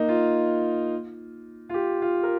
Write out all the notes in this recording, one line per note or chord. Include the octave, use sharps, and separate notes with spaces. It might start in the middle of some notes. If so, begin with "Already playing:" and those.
Already playing: A#3 D#4
F4
F4
G4
F4
A#4